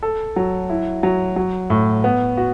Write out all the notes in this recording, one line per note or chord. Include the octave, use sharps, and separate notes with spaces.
A4
F#3
E4
F#3
F#3
A2
B3
F#4